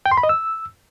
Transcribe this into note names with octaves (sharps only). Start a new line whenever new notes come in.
G5
C6
B5
D#5
E6